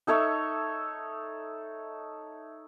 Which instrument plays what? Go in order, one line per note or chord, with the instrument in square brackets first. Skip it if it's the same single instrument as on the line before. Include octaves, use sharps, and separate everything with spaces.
[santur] D#4 A4 C#5 E5